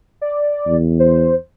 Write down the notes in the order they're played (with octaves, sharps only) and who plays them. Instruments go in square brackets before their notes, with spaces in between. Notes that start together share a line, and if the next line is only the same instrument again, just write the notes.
[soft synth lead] D5
[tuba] E2
[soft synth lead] C5